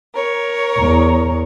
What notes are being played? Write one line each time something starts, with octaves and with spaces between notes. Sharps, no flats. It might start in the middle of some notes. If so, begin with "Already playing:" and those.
A#4 C#5
E2